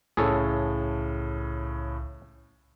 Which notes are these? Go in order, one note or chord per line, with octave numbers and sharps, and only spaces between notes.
C2 A2 C#3 G#4 A4 C#5